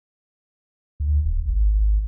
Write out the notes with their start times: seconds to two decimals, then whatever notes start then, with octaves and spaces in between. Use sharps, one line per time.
1.00 D2
1.24 D1
1.46 G#1